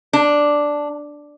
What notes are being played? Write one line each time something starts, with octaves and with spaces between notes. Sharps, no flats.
D4